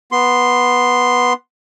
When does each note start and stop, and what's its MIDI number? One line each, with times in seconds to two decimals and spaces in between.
0.12 1.33 59
0.12 1.33 84